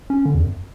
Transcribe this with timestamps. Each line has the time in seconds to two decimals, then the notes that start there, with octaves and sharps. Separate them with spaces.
0.10 C#4
0.26 D3
0.35 E2
0.43 F#2